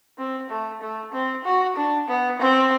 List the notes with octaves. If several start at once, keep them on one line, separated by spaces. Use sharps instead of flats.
C4
A3
A3
C4
F#4
D4
B3
C4